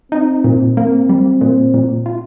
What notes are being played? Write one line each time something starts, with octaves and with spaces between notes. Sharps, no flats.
C4 D#4
A#2
A#3 C4
G3
A#2
A#2
F4